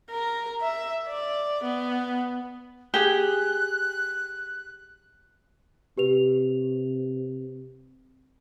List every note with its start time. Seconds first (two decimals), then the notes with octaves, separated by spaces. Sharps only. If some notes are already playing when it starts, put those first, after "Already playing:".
0.11 A#4
0.61 E5
1.08 D5
1.63 B3
2.94 G4 G#4 F#6
5.97 C3 G4 B4 F7